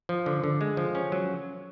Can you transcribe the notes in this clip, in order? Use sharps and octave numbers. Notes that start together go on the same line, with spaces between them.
F3
D3
D3
G#3
F3
C#4
F#3